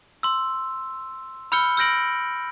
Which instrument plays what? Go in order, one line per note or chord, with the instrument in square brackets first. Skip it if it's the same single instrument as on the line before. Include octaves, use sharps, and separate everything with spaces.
[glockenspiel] C6 E6
B5 E6 F6 G6 C#7 G7
E6 F6 G6 A#6 D7 F#7